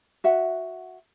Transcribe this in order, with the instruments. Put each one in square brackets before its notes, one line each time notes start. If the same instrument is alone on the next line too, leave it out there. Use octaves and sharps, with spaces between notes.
[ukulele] F#4 E5 F#5